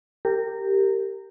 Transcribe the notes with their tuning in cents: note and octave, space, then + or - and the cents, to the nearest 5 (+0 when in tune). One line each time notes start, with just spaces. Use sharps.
G4 +0 A#4 -20